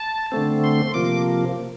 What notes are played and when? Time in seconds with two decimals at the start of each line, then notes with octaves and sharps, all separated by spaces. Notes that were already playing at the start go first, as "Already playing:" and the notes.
Already playing: A5
0.32 D3 A3 C4
0.64 C6
0.94 C3 F3 A#3 D6